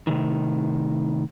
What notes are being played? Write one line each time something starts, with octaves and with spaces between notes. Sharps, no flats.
A2 C3 D#3